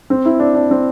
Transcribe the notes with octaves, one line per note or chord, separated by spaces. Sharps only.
C4
E4
D4
D4
C4